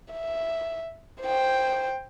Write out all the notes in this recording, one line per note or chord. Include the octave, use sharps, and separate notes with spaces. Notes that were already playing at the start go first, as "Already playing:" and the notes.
E5
C5 G5